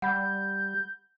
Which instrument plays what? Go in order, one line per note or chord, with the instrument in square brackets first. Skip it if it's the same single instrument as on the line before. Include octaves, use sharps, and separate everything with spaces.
[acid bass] G3 [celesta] F#5 B5 [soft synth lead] G6